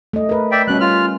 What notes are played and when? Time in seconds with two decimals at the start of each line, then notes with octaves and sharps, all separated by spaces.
0.13 A3 D#5
0.29 A#4 B4
0.52 D5 E5 G5
0.68 B2 G3 C#4 F#6
0.81 F4 F6